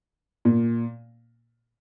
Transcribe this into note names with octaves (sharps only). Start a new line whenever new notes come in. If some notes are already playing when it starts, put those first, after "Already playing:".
A#2